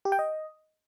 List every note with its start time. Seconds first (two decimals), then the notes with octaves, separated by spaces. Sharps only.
0.05 G4
0.12 G5
0.19 D#5